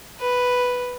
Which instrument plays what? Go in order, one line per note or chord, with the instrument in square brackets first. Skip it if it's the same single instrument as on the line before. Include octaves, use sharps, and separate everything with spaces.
[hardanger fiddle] B4